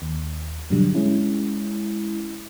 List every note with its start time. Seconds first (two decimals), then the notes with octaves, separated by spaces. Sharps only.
0.02 D#2
0.70 G2 B2 D3 F#3 G3
0.94 G#3 C#4 E4